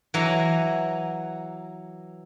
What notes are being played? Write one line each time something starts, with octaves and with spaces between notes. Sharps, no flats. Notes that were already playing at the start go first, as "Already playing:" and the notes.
E3 F#3 F#4 F#5 G#5 A#5